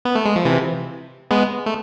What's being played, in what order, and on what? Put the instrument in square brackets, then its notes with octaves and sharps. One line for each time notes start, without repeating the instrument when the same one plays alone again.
[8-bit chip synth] B3
A3
G#3
F3
C3 E3
G#3 B3
A3